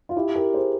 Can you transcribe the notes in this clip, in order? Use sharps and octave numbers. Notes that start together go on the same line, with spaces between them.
F4
E4 G4
G4 A#4
G#4 C5